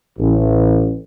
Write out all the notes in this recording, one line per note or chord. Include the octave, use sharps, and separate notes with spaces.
A1